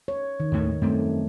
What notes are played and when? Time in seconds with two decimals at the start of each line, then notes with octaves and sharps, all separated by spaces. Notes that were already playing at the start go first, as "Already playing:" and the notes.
0.08 C#5
0.40 D#3
0.52 D#2 A2 A3
0.82 F#2 G3 A3 C4